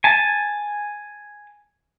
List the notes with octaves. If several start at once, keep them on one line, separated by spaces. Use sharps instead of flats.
G#5 A5